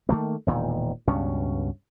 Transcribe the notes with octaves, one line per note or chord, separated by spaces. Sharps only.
D#3 F3 A3 A#3
E1 A#2 D#3
C#2 G2 B2 C#4